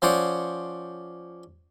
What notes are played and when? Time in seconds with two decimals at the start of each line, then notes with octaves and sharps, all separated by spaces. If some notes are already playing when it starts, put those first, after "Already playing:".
0.02 F3 C#4 C5 D5 F#5 D#6